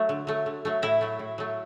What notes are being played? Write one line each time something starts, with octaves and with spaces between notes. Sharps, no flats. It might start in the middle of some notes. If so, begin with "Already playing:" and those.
Already playing: F#3 A3
D3
F#3 A3
D3
F#3 A3
A2 E4
F#3 A3
A2
F#3 A3